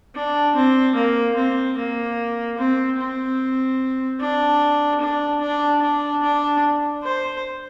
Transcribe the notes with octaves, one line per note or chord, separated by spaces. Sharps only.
D4
C4
A#3
C4
A#3
C4
C4
D4
D4
D4
D4
D4
C5